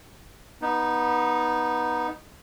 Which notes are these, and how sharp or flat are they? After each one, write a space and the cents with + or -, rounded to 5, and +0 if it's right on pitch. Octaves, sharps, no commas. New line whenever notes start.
B3 -15 D#4 +0